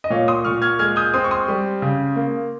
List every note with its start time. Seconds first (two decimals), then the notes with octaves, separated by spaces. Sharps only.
0.04 D#5
0.10 A#2 C#5 F5
0.28 C6 D#6
0.45 A#2 C#6 F6
0.62 F6 G#6
0.79 G#3 F6 G#6
0.96 D#6 G6
1.14 C4 C6 D#6
1.24 C#6
1.31 C6 D#6
1.48 G3
1.82 C#3
2.16 A#3